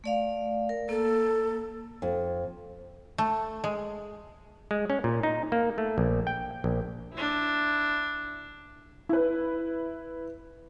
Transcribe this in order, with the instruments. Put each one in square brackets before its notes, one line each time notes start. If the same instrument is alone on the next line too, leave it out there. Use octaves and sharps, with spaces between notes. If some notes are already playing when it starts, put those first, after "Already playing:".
[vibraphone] A3 D5 F5
A#4
[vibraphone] A#3 [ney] A4
[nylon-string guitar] F2
[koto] A3
G#3
[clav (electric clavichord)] G#3
C#4
A#2
D#4
A#3
A3
A#1
G5
A#1
[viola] D4 E4
[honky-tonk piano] E4 B4